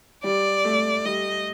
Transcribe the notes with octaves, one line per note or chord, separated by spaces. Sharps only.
G3 D5
A3
G3 D#5